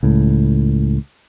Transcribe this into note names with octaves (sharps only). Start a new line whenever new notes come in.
C#2 A2